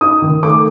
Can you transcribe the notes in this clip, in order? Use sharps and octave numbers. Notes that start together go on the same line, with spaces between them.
D#4 D#6
D#3
A3 D6